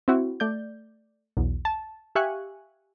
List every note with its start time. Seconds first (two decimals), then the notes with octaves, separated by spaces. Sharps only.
0.08 C4 E4 F#4
0.40 A3 D5 G6
1.37 B1 E2
1.65 A5
2.15 G4 E5 F5 G#5 C#6 F#6